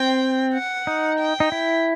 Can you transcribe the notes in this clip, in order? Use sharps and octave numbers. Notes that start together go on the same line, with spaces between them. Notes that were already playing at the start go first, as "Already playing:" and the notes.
Already playing: C4 G5
F#5
D#4
G5
D#4
E4